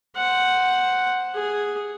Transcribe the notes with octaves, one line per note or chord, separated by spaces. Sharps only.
C5 F#5
G#4